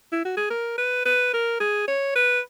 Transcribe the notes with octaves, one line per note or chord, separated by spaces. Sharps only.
E4
F#4
G#4
A#4
B4
B4
A#4
G#4
C#5
B4